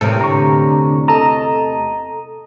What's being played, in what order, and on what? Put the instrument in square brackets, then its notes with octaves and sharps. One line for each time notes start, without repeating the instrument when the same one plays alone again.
[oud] E2 A2 C3 [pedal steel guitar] A4 A#4
[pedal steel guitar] D3 [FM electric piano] A#5 C#6
[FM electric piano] A4 A#5 [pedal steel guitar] D#5 A5